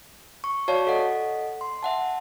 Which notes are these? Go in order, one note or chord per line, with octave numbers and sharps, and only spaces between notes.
C#6
F#4 C#5 D5 F5 A5 C#6
A4 D#5 F#5
C6
E5 F#5 A5